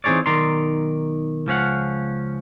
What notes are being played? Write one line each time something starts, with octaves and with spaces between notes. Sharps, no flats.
E3 C4 D#4 G#4 C#5 D5
B1 D#3 D5 A#5 C6
C#2 F3 C#4 F5 F#5